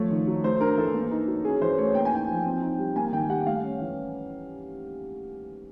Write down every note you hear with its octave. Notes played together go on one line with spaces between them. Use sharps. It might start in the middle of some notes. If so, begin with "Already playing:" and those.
Already playing: F3 A3 C#5
D#3
F#3
A3 C5
D4 A#4
E3 A4
A#3
D#4
F#3
C#4 G#4
E3 C5
A3 C#5
A#3 G5
G#5
D#4 G5
F3
C4
D#4
G3
A#3 G#5
D#3 G5
G3 F#5
A3 F5
C#4
E3